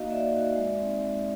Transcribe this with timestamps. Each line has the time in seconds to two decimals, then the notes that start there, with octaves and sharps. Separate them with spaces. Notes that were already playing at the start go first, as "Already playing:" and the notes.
Already playing: A#3 D#4 F#4 D#5 F5
0.10 A#3 D5 E5
0.33 D#4 F#4
0.56 G#3
0.78 C4 D#4
1.01 G#3